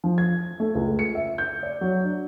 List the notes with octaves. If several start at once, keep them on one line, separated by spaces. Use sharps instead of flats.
F3
G#6
A3
C#2
C#7
E5
G6
D5
F#3
D4